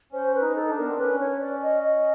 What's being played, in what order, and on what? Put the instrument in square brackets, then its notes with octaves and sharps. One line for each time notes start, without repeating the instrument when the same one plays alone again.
[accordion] C#4 [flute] C5
[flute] B4
[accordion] D#4
[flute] A4
[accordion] D4
[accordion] B3 [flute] A#4
[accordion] C4
[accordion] C#4 [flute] B4
[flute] C#5
D5
D#5
D#5